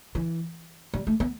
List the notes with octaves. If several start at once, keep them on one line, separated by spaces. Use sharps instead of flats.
E3
G3
A3
B3